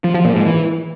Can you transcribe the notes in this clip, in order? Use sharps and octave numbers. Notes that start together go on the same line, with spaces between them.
F3
F3
A#2
G#2
E3